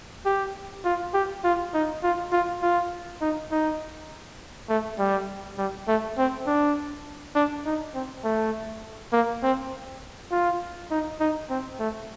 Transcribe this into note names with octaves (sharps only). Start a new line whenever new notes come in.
G4
F4
G4
F4
D#4
F4
F4
F4
D#4
D#4
A3
G3
G3
A3
C4
D4
D4
D#4
C4
A3
A#3
C4
F4
D#4
D#4
C4
A3